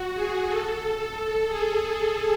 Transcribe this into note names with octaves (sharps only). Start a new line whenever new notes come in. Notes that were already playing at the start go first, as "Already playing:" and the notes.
Already playing: F#4
G#4
A4
A4
G#4